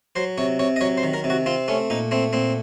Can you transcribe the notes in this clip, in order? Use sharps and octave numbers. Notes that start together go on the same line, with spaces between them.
F#3 C5
C3 C#5
C3 C#5
D#5
F#3 C#5
C5
D#3
A#4
C3
F#4
C4 F4
A3 C#4
A#2 D#4
A3 C4
A#2 C4